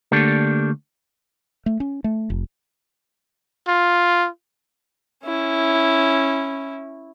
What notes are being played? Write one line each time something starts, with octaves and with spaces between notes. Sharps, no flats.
D3 A3 A#3 D4 G4 A4
A3
C#4
A3
F1
F4
C#4 E4